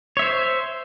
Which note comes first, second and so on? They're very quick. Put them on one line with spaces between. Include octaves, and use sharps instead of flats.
C#5 E5 C5